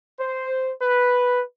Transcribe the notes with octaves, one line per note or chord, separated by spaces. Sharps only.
C5
B4